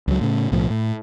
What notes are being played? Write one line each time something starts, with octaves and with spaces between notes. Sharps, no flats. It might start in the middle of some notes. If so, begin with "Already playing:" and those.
C#2 F#3
A2 C#3
B1 A2 F3
A2